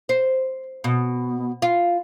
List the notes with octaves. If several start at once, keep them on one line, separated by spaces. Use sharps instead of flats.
C5
B2
F4